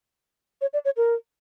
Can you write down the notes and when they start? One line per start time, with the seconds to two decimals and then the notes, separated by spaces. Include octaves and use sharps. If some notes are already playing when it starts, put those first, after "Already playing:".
0.61 C#5
0.73 D5
0.85 C#5
0.97 A#4